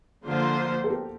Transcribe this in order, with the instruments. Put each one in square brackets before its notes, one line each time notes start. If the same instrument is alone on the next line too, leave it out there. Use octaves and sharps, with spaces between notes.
[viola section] D3 F3 A#3 F4 C5
[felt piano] A4
G4 A#4